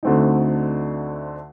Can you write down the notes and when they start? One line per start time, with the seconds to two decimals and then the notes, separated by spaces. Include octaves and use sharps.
0.03 D2 D3 A3 C4 D#4